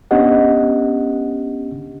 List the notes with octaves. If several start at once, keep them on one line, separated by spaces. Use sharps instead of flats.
B3 C#4 D4 G4 D#5 F#5